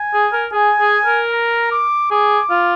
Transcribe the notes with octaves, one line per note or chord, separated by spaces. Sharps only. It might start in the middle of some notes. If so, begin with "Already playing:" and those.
Already playing: G#5
G#4
A#4
G#4 G#5
G#4
A#4
A#5
D6
G#4 D6
F4